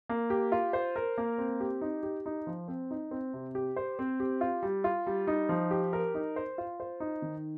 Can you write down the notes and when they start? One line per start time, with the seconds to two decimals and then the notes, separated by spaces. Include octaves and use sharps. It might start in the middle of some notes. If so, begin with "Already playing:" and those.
0.09 A#3
0.30 G4
0.52 F4
0.73 C5
0.96 A#4
1.18 A#3
1.38 C4
1.60 G4
1.81 D#4
2.03 G4
2.26 D#4
2.47 F3
2.68 C4
2.91 D#4
3.11 C4
3.33 C3
3.55 G4
3.76 C5
3.99 C4
4.20 G4
4.41 F4
4.63 G3
4.84 F4
5.07 G3
5.27 D#4
5.49 F3
5.71 G4
5.93 A#4
6.15 D#4
6.36 C5
6.58 F4
6.80 C5
7.00 D#4
7.22 D#3